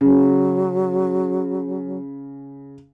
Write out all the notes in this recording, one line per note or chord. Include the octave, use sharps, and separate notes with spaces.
C#3 F#3